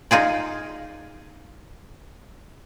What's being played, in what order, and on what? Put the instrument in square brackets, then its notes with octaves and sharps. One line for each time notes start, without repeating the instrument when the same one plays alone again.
[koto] D#4 F4 G#4 D5